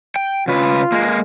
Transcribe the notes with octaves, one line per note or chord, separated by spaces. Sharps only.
G5
C#3 F4 B4
G#3 A#3